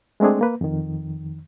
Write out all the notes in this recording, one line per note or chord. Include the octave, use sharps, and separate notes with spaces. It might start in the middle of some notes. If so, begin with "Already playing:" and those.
G#3 A3 C4 D4 G#4
A#3 B4
F2 D#3